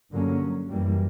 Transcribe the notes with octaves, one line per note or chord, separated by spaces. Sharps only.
G2 D3 F#3 A#3 C#4
F#2 E3 G3 A#3